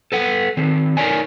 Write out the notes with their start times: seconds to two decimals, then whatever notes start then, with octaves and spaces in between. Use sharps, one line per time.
0.12 A4 B4 F#5
0.57 D#3 C4
0.97 D#4 A#4 C#5 D5 G#5